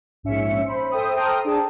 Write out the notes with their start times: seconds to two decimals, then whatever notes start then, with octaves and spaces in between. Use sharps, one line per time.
0.23 A#1 G#2 C#4 E5 C#7
0.65 C5 B5
0.91 A4 C5 E5 G5 D#6
1.16 A4 C5 G5 A#5 D#6 F6
1.45 D4 G#4 A5